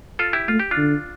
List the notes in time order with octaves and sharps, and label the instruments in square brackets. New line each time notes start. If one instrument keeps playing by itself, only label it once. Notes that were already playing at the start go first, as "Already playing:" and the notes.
[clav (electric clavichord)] F4 A4
E4 G4
[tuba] A3 [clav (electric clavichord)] F4
[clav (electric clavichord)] G4
D4 F4
[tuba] D3